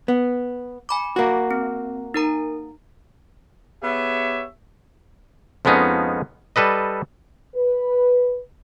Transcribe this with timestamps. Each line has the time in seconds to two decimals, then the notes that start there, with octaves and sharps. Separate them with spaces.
0.08 B3
0.89 G#5 B5 D6
1.16 A#3 F#4
1.51 C4
2.14 D#4 A#4 A#5
3.83 B3 G4 G#4 C#5 E5
5.65 F2 F3 G#3 B3 C#4 D#4
6.56 G3 A4 B4 D#5
7.55 B4